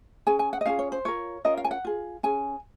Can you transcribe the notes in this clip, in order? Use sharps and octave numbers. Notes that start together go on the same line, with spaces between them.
C#4 G#4 G#5
G#5
F#5
D#5
C#4 F4 G#4 F5
C#5
C5
F4 A#4 C#5
C#4 F4 A#4 D#5
F5
G#5
F#5
F4 G#4
C#4 G#4 G#5